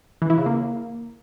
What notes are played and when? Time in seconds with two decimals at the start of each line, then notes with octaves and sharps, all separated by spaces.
0.22 E3
0.30 E4
0.38 C#3
0.46 A#3